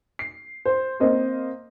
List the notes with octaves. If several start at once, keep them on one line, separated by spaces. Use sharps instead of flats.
C7
C5
A#3 C4 C5 D#5